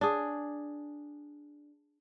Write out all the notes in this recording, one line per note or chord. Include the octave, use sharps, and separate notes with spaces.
D4 G#4